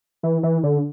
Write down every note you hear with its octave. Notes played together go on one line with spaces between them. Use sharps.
E3
E3
D3